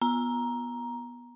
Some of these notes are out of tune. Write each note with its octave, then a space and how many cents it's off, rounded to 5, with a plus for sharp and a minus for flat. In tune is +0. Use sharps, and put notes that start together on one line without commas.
B3 -15 A#5 +10